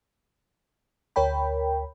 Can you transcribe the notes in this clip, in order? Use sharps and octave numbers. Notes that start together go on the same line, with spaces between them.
D2 A#4 C#5 G5 B5